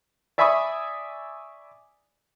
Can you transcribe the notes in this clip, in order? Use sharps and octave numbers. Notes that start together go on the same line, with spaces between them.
D5 E5 G#5 B5 C#6 D#6